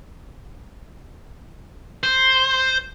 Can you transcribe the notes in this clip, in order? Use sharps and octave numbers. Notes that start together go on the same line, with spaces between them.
C5